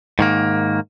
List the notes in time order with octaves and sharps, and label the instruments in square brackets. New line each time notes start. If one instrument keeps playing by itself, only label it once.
[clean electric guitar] G#2 D#3 A#3